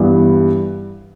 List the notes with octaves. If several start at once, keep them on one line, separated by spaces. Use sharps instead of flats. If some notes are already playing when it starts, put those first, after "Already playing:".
Already playing: G2 E3 B3